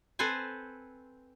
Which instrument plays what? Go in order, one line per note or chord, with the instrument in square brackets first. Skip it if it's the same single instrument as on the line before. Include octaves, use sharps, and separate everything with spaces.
[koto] C4 A4 B4 C5 G#5